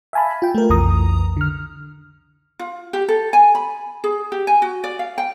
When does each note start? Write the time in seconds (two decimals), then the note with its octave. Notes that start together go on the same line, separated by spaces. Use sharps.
0.13 E5 F5 G#5 A5 B5
0.42 F4 G5
0.55 A3 A#4
0.70 B1 F2 E3 A#5 D#6
1.37 D3 F6
2.59 F4
2.93 G4
3.08 A4
3.33 G#5
3.55 B5
4.04 G#4
4.32 G4
4.47 G#5
4.62 F#4
4.84 D5
4.99 F5
5.18 G5